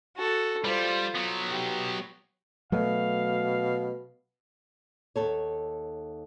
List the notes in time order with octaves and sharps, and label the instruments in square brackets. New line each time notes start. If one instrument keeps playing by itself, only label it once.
[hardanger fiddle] F#4 A4
[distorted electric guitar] G3 [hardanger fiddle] F4 C5
[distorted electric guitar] F#3 B3
[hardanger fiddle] G4
[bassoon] B2 [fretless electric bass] F#3 A3 [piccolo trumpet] F5
[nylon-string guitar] D#2 A4 C#5